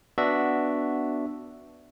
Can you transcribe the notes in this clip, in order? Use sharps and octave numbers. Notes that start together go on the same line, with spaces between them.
B3 D4 F#4 E5